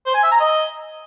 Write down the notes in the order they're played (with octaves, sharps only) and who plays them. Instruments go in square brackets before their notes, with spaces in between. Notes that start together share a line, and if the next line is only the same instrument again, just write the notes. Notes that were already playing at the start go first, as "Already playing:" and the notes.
[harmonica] C5
G#5
E5
A#5
D#5